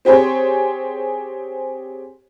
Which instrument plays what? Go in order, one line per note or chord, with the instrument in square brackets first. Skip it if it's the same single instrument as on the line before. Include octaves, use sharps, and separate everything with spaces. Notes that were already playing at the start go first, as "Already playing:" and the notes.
[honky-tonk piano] C4 G4 G#4 C5 C#5